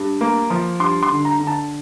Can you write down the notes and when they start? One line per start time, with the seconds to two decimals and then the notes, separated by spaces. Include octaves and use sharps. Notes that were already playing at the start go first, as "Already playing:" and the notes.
Already playing: G2
0.21 A#3
0.50 F3
0.80 G2 C6
1.03 C6
1.10 D3
1.25 A#5
1.40 D3
1.47 A5